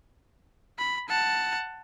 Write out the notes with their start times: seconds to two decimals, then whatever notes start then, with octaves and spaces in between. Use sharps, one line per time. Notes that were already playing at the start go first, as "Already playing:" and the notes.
0.78 B5
1.09 F#5 A5